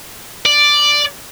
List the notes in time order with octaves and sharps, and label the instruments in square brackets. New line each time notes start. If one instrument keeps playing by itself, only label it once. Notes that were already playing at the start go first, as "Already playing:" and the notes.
[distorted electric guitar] D5